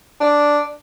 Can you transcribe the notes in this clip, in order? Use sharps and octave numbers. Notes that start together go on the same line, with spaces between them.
D4